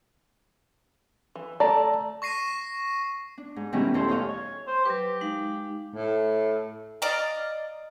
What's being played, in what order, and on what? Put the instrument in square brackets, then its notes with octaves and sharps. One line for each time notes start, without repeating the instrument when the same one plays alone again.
[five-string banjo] E3
[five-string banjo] A3 D5 [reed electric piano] A5 A#5
[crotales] C#6 A#6 C7 D#7
[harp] D4
G#2
B2 D#3 E3 G3 A3 C#4
E2 E3 A4 C5 C6
C5 C#5 D#5 F5
[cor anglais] C#5
C5
[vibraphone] F#3 B4 [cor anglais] G4
[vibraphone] G#3 D#4 F5
[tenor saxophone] A2
[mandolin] D5 D#5 F5 A#5